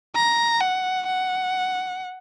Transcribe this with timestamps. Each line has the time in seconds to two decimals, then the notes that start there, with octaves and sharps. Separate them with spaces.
0.16 A#5
0.61 F#5
1.07 F#5